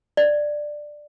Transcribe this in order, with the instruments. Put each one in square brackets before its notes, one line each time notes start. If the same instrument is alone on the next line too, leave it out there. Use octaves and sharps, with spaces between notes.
[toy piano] D5